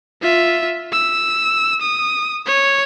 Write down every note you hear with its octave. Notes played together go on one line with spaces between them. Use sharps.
F4 E5
E6
D#6
C#5